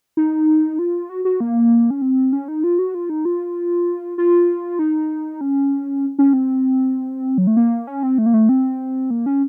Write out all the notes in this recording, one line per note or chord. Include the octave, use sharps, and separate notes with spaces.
D#4
F4
F#4
F#4
A#3
C#4
C4
C#4
D#4
F4
F#4
F4
D#4
F4
F4
D#4
C#4
C#4
C4
F#3
A3
A#3
C#4
C4
A3
A#3
A3
C4
A#3
C#4